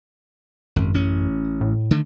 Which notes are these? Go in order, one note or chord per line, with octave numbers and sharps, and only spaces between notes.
G#1 F#2
A1 C#4
A2
D3 D#3 A3